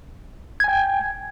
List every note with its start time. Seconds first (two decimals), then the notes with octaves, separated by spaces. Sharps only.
0.60 G#6
0.64 G#5
0.68 G5